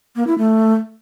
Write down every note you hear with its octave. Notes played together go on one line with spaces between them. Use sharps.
A#3
E4
A3